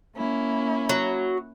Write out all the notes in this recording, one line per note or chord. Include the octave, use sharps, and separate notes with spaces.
A#3 C#4 E4
F#3